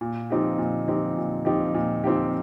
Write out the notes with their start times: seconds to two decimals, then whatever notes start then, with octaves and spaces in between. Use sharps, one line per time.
0.01 A#2
0.30 F3 C4 D#4 G4
0.58 A#2
0.88 F3 C4 D#4 G4
1.17 A#2
1.45 F3 C4 D#4 G4
1.74 A#2
2.04 F3 C4 D#4 G4